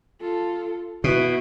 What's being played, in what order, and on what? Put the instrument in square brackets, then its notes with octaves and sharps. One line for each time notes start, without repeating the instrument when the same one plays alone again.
[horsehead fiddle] F4 A4
[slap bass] B2 [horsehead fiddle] E4 F#4